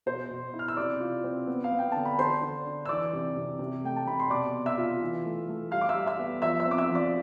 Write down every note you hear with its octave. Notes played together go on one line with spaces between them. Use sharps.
B2 C5 C6
B2
E4
F6
E6
C3 D5 D6
F4
C4
B3
F5
B3
G5
D3 A5
B5
D3 C5 C6
D3
D4
E6
E3 D5 D6
C3
C3
C3
A3 G5
A5
C3 B5
C6
B2 D5 D6
B3
E5 E6
F4
E3
A3
A3
G3 F5 F6
D6
E5 E6
G3
E5 E6
B3
F3 E5 E6
E5 E6
C4
D6
E5 E6
F3
D5 D6